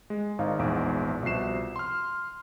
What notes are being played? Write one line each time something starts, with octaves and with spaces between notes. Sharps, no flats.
G#3
G#1 D#4 F5
A#1 E2 G#2 D7
C2 B2 F3 F#4 C7 E7
C6 F6